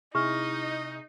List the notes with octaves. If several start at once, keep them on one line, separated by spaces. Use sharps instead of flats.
C3 D#4 E4 G#4 D#5 C#6 F6